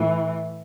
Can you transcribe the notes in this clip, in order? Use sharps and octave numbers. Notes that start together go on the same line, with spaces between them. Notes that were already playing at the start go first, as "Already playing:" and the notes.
Already playing: A2 E3